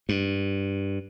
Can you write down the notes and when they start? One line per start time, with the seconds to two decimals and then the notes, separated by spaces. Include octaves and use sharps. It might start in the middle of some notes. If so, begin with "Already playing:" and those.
0.09 G2